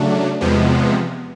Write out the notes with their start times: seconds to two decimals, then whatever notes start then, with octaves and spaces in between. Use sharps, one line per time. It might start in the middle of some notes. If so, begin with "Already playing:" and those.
Already playing: C#3 F#3 A3 D4
0.41 E2 C3 F3 G#3 B3